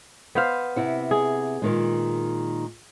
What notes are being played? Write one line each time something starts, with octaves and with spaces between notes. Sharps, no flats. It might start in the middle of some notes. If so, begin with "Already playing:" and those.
B3 C5 F5
C3 E4 F#5
G#4
A#2 D#3 G#3